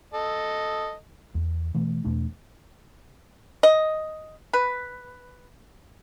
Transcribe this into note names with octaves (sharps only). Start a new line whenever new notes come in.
A4 D#5
E2
B2 E3 A3
E2 B2 A3 D4
D#5
B4